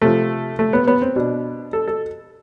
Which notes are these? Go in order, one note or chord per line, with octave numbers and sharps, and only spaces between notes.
C3 F3 A3
A3
B3
B3
C4
B2 D4
A4
A4